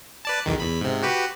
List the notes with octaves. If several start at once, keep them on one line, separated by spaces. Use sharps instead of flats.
B4 D5 A5
B1 E2 D#3
E2 B5
G#2 C3
F#4 G4 B4